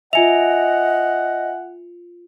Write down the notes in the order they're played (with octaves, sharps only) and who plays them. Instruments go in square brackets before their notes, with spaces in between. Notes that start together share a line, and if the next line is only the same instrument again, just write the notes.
[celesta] F4 C#7 F7 [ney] D#5 [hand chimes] E5 G#5 [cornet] F#5